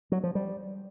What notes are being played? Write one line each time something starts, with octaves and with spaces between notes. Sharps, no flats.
F#3
F3
G3